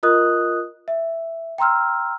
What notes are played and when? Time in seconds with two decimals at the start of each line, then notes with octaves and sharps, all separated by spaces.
0.03 F4 A#4 D#5 D#6 F#6
0.88 E5
1.58 G5 A#5 C6 E6 F6